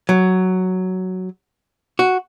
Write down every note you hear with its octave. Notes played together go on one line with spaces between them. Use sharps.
F#3
F#4